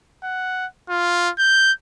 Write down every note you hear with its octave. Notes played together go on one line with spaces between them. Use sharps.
F#5
F4
G6